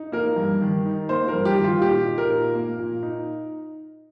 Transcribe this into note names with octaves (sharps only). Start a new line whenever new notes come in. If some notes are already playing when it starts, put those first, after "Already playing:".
Already playing: D#4
A#3 A#4
G2
D#3
D#4
A#3 C5
A#4
G2
G4
D#3
F4
A#2 G4
D#4
A#4
A#2
A#3
A#2
D#4